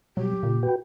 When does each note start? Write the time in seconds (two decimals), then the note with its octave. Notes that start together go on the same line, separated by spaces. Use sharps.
0.17 B2 F#3 G3 G4
0.43 A#2 C#3
0.63 F#4 B4 G5